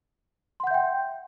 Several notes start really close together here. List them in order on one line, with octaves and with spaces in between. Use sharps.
C6 F#5 G6 E5 G5